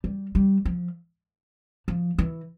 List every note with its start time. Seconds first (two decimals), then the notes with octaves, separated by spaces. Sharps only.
0.04 G3
0.35 G3
0.65 F3
1.88 F3
2.18 E3